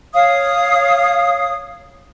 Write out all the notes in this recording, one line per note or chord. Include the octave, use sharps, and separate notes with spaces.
C#5 F5 D#6